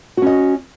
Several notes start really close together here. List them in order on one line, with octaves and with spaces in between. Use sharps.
F#4 C#4 D#5